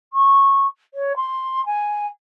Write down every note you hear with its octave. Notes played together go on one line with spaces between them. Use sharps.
C#6
C#5
C6
G#5